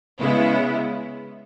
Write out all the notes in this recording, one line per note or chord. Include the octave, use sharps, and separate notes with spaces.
C#3 G#3 B3 E4